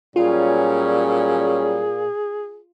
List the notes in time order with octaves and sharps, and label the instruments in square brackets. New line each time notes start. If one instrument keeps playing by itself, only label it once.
[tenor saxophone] A#2 [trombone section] F#3 G3 C#4 [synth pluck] F4 [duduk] G#4